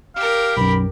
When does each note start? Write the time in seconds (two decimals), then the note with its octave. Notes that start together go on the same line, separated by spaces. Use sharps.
0.16 G4 A#4 F5
0.57 B1 F#2 B5